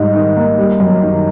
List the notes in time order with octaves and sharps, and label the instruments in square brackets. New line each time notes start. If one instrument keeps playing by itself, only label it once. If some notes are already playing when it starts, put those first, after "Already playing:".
Already playing: [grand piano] G#2 G3 [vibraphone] D#5
[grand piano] D#3
A#3
G3
F#2
D#3